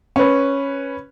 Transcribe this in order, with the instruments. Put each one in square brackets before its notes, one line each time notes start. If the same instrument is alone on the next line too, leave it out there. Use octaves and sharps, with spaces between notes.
[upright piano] C#4 B4